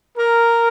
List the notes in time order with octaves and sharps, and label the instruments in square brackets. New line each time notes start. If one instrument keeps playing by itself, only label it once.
[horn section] A#4